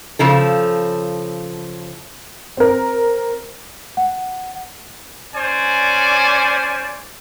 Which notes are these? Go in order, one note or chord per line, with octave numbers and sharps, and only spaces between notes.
C#3 F3 A4
C4 A#4
F#5
C#4 C5 D5 G#5